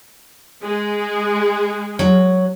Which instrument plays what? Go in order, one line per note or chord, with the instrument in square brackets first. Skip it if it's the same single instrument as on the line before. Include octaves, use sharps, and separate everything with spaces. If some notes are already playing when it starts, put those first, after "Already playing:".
[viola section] G#3 G#4
[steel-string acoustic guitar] F#3